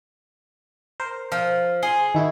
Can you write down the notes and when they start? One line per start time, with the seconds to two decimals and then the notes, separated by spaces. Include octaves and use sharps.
1.00 A#4 C5
1.32 F3
1.83 G#4 C6
2.15 D#3 E4 F#4